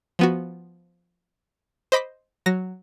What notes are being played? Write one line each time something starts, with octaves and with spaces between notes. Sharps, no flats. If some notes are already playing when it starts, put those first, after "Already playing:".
F3 B3 F#4
C5 D#5 B5 D6 B6
F#3 A#6